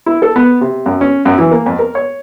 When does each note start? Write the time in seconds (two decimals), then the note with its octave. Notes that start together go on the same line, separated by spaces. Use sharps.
0.06 E4
0.22 A4
0.36 B3
0.61 C3
0.86 F#2
1.01 C#4
1.25 F#2
1.38 E3
1.51 A#3
1.66 F2
1.79 A#4
1.95 C#5